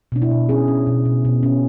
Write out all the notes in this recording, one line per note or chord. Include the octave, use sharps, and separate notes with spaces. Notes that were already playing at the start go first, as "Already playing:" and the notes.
B2 D4
E4
B2
C#4 G#4
C#4
B2
B2
B2
C#4